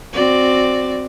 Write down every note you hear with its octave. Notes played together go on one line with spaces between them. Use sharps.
C4 F#4 D5